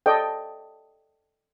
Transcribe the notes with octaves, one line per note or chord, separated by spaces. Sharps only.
A4 D5 D#5 G5